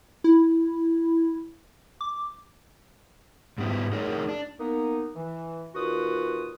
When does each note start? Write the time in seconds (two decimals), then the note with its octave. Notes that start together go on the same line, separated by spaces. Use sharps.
0.24 E4
2.01 D6
3.58 G#2 G3 B3 E4
3.92 D#4 G#4 A#4 C#5
4.29 D4
4.60 A#3 B3 D#4
5.16 E3
5.75 D#2 A#2 F4 F#4 B4 D#6